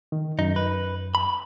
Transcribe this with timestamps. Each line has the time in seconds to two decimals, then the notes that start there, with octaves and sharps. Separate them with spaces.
0.12 D#3
0.39 F#2 D#4
0.56 B4
1.15 B5